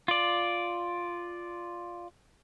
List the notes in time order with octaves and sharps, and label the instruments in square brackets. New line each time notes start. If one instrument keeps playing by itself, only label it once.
[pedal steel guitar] F4 D5